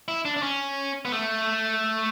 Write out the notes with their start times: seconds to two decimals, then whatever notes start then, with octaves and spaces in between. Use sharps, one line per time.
0.08 E4
0.25 D4
0.37 D4
0.43 C#4
1.05 B3
1.12 A3